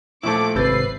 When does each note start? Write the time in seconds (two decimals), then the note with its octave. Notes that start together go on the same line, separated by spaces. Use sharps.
0.23 A#2 F3 A3 E4 A4 D6
0.56 G#1 C3 B4 E6 G6 A6 C7